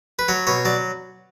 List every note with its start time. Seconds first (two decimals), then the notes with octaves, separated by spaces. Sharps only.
0.19 B4
0.28 F#3 C#5
0.47 B2 C#5
0.65 F#3 D5